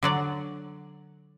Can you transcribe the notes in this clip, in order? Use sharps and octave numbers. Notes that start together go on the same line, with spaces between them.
D3 F#3 D5